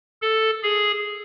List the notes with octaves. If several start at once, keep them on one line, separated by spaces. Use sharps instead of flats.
A4
G#4